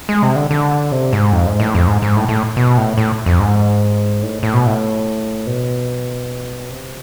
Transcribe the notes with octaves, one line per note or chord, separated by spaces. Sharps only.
G#3
C3
D3
D3
C3
G#2
F2
G#2
A2
F2
G#2
G#2
A2
A2
B2
A2
A2
F2
G#2
A2
A2
B2
A2
B2
C3